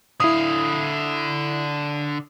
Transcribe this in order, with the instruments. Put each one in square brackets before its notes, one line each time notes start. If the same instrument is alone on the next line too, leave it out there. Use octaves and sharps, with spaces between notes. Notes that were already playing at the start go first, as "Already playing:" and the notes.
[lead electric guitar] D3 F5 [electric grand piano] E4 D#6